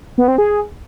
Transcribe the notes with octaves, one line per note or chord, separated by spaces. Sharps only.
B3
C4
G#4